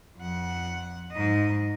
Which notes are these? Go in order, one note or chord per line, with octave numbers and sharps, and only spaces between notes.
F2 F#5
G#2 D#5